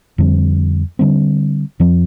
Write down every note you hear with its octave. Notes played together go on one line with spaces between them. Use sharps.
F2 D3 G3 C4
D3 G3 C4
F2 F3 C4